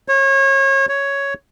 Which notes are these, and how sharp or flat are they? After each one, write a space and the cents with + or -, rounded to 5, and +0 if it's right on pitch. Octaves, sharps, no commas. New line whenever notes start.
C#5 -30
C#5 +5